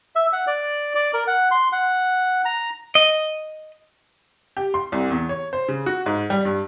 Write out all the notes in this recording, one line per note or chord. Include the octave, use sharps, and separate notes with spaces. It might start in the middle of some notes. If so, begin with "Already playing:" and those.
E5
F#5
D5
D5
A#4
F#5
C6
F#5
A#5
D#5
G4
C6
C2
E2
C#5
C5
C#3
F#4
G#2
G3
G2